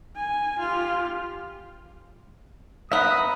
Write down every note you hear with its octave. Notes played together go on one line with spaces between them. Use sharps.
G#5
F4 G4
B3 E5 F#5 A#5 B5 D#6